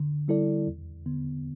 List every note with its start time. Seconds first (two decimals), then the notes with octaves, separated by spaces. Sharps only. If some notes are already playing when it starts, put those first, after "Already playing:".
Already playing: D3
0.28 G3 E4 A4 D5
0.67 E2
1.06 D3 B3